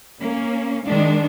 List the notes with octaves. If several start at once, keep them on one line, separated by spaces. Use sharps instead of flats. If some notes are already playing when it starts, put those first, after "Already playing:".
A#3 C#4
D#3 G#3 D4